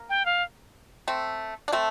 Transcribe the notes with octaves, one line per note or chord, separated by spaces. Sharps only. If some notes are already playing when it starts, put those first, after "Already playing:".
Already playing: A#3
G5
F5
A3 C4
D4
A3 C4 A5